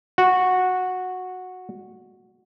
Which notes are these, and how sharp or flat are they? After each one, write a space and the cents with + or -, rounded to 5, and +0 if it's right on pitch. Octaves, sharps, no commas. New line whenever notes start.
F#4 -10